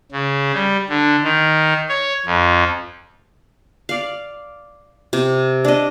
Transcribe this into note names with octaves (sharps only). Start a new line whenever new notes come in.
C#3
G3
D3
D#3
C#5
F2
D5 F5
C3
D4 D#5